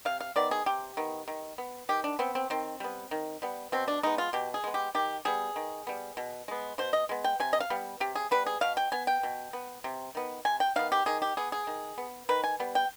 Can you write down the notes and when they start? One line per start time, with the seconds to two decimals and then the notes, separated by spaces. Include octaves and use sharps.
0.05 C3 F5
0.20 F5
0.36 D#3 B3 D5
0.51 G#4
0.66 C3 G4
0.97 D#3 B3
1.28 D#3
1.58 B3
1.89 D#3 G4
2.04 D4
2.19 B3 C4
2.35 C4
2.50 D#3 C4
2.80 G3 B3
3.11 D#3
3.42 G3 B3
3.72 B2 C4
3.88 D4
4.03 G#3 B3 D#4
4.18 F4
4.33 B2 G4
4.54 G#4
4.64 G#3 B3
4.74 G4
4.95 D#3 G4
5.25 G3 B3 G#4
5.56 D#3
5.87 G3 B3
6.17 B2
6.48 G#3 B3
6.78 B2 C5
6.93 D#5
7.09 G#3 B3
7.24 G5
7.40 C3 G#5
7.53 D#5
7.60 F5
7.70 G3 B3
8.00 C3 G4
8.15 G#4
8.31 G3 B3 B4
8.46 G#4
8.61 B2 F5
8.77 G5
8.92 B3 G#5
9.07 G5
9.23 B2
9.53 B3
9.84 C3
10.15 D#3 B3
10.45 C3 G#5
10.60 G5
10.76 D#3 B3 F5
10.92 G4
11.06 D#3 G#4
11.22 G4
11.37 B3 G#4
11.52 G#4
11.67 D#3
11.98 B3
12.29 D#3 B4
12.44 G#5
12.60 G3 B3
12.75 G5